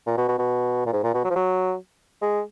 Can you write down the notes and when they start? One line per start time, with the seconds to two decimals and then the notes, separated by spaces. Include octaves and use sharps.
0.07 A#2
0.17 B2
0.28 B2
0.38 B2
0.86 A#2
0.93 G#2
1.03 A#2
1.14 B2
1.24 F#3
1.30 F3
1.35 F#3
2.22 G#3